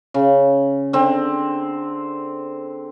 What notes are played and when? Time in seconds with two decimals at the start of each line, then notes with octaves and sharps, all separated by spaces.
0.14 C#3
0.93 D3 C4